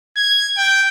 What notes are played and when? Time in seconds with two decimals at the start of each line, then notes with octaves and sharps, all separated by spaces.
0.17 G#6
0.58 G5